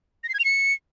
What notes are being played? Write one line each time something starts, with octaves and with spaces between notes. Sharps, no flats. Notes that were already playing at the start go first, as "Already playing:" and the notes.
A#6
C7
G#6
F7
C#7